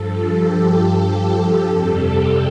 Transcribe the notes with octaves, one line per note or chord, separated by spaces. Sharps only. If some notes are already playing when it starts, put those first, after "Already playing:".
Already playing: G2 F3 A4
G4
F2 C3 G3 A4
G4